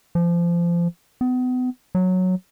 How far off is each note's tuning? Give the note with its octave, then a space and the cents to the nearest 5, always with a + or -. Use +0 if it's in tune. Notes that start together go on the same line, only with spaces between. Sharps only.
F3 -25
B3 +35
F#3 -5